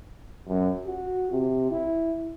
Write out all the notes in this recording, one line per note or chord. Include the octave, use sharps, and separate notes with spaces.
F#2
F#4
C3
E4